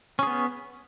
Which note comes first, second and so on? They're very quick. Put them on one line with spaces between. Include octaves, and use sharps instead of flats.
C#4 G#4 B3